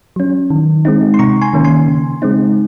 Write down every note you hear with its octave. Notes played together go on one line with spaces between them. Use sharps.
F#3 C#4
D#3
G#3 C4 D#4
C6
C3 A#5 C#6
G#5 C6
D#3 A#3 C#4
G#5 C6
C#3
G#3 C4 D#4